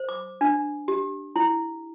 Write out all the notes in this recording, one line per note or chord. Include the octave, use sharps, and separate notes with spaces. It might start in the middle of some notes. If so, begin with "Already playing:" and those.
Already playing: C5
D6
D4
G4
E4